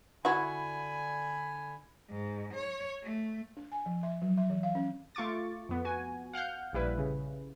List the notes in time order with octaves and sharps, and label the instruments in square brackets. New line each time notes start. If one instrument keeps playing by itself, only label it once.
[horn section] D3 G#5 B5 [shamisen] E4 F#4
[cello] G#2
C#5
A3
[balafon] D4
G#5
F3
E5
F#3
E5
E3
F5
C#4
[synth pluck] A3 F4 C#6 D6 A6
F2 B3
F#4 G#5
F5 F#5 F6 G6
A#1 G3 E4 B4
C#3